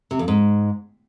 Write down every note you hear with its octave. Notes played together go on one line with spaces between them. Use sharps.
C3
F2
G#2